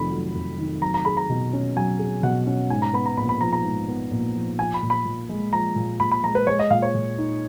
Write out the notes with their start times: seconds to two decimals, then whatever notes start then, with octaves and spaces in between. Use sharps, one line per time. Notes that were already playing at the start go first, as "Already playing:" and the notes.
Already playing: F1 F2 D#3 F#3 B5
0.11 F#3
0.35 F1
0.58 D#3
0.81 F#3 A#5
0.94 A#5
1.05 G#4 B5
1.17 A#5
1.30 B2
1.53 C#4
1.76 F#3 G#5
1.99 G#4
2.23 B2 F#5
2.47 C#4
2.70 G#2 G#5
2.82 A#5
2.93 B3 B5
3.06 A#5
3.17 A#1 B5
3.29 B5
3.41 F3 A#5
3.53 A#5
3.64 G#2
3.88 B3
4.11 A#1
4.35 F3
4.59 F3 G#5
4.74 B5
4.83 A#2
4.90 B5
5.05 A#2
5.29 G#3
5.52 F3 A#5
5.76 A#2
6.00 A#2 B5
6.12 B5
6.23 G#3 A#5
6.35 B4
6.47 G#3 C#5
6.59 D#5
6.70 A#2 F5
6.82 C#5
6.95 A#2
7.18 D#4